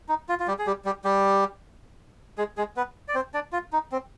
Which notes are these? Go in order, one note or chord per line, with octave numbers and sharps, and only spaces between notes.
D#4
F4
F4
G3 G4
G#4
G3 G4
G3 G4
G3 G4
G#3 G#4
G#3 G#4
B3 B4
D5
C4 C5
D4 D5
F4
D#4
C4